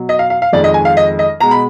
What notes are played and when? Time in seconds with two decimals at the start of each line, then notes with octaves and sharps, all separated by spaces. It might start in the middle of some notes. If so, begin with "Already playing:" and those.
Already playing: B2 F#3
0.09 D#5
0.19 F5
0.30 F5
0.42 F5
0.53 F2 D#3 G#3 D5
0.64 D#5
0.74 G#5
0.85 F5
0.97 D#5
1.19 D#5
1.40 B2 G#3 A#5
1.51 B5